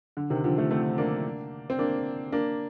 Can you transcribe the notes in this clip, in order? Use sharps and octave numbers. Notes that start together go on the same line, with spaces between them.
D3
C3 D#3
D3 F3
F3 A3
A3 C4
A#3 D4
C4
A#3 D4
A#3 D4